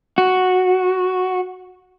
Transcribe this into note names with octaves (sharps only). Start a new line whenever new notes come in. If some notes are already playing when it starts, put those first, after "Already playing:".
F#4